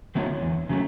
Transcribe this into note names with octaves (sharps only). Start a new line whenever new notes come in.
D3 F#3 A3 C4
E2
C#3 F#3 A3